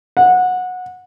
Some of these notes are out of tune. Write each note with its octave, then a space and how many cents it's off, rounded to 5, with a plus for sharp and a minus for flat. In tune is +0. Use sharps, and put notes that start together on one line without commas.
F#5 -20